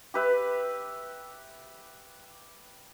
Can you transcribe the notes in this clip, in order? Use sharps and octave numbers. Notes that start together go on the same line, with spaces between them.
G4 B4 E5